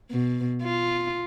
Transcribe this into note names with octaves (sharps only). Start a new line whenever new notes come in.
B2
F4